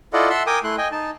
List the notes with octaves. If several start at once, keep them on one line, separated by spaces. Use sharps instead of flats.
E4 F4 A4 D5 D#5 F#5
E5 F#5 A5 C6 E6
A#4 G5 G#5 D6 D#6
A3 E4 C6 F#6
D#5 G5 G#5
D#4 A5